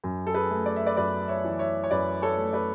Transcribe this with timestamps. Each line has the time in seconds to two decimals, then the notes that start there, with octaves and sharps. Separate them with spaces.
0.04 F#2
0.27 A4
0.34 G#4 B4
0.51 A3
0.66 D5
0.76 E5
0.86 B4 D5
0.97 F#2 B4 D5
1.28 C#5 E5
1.45 E3
1.59 C#5 E5
1.84 C#5
1.90 F#2 B4 D5
2.22 A4 C#5
2.37 A3
2.53 B4 D5